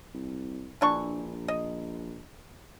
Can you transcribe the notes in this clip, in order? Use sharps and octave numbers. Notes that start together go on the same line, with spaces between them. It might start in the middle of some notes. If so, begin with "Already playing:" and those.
C2
A#1 E3 D4 C#6
D#5